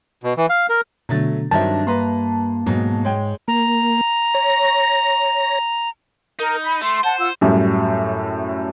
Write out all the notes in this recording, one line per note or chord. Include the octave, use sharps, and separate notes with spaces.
B2
E3
F5
A#4
B2 D3 F#3 A3 A6
G2 D#3 F#3 C4 D4 E5 A5
A#3 B4 A#5 C6
G#2 B2 F#3
G#3 C#5 G5
A#3 A#5
C#5 A#6
D#4 A#4
B5
A3 C6
C5 F#5 A5
F4 F#5 E6
F#2 A2 G3